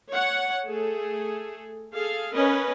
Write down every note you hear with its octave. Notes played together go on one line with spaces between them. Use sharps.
C#5 F#5
A3 G#4 A4
G#4 A4 F5
C#4 A#4 B4 D#5